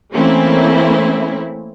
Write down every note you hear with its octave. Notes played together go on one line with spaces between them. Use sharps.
E3 A3 A#3 C4 C#4 E4